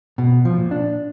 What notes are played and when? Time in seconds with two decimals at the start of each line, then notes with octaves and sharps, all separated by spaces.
0.18 B2
0.45 F3
0.58 A#2
0.71 D4